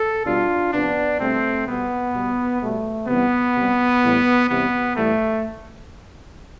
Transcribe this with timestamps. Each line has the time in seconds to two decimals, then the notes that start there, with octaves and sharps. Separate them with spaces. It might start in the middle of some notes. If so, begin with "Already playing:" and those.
Already playing: A4
0.25 B2 G3 D4 F4
0.73 C3 F3 B3 D4
1.20 B2 G3 A3 C4
1.66 B2 G3 B3
2.13 B2 G3
2.61 B2 G3 A3
3.08 C3 E3 G3 B3
3.55 C3 G3
4.02 A2 E3 G3
4.49 C3 E3 G3 B3
4.96 A2 E3 G3 A3